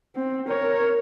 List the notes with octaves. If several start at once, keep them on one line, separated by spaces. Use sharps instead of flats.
C4
A#4 C#5